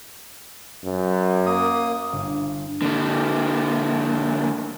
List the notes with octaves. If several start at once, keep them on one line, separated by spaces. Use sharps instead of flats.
F#2
A#3 D#6
G1
D3 A#3